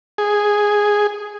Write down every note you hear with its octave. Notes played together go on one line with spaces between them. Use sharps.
G#4